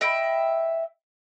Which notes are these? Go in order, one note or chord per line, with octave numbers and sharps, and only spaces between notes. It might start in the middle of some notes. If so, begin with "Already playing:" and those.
D#5 E5 G5 B5